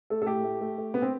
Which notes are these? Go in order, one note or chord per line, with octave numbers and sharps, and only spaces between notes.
A3 A4
A4
A2 G4
A3
A3
A3
A3 B3
C4